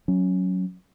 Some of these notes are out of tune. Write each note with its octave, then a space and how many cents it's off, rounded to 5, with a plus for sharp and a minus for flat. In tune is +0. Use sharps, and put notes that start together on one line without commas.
F#3 +0 C#4 +0